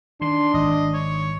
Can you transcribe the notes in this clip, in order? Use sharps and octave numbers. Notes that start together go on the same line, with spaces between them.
D#3 D4 C6
G#1 D#5
C#5